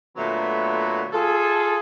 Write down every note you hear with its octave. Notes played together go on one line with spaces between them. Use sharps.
A#2 D3 F#3 A3 B3
F4 G#4 A4